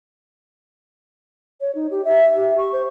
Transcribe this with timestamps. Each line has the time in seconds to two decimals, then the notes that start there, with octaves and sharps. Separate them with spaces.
1.61 C#5
1.75 D#4
1.91 G4
2.05 E5
2.35 G4
2.58 C#6
2.73 C5